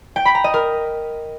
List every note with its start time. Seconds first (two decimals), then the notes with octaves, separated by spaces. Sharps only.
0.16 G5
0.25 B5
0.35 A#5
0.44 D#5
0.54 A#4